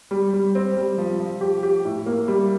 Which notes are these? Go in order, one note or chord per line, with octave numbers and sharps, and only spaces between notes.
G3
G3
C4
G3
F3
F3
G4
G4
A2
A#3
G3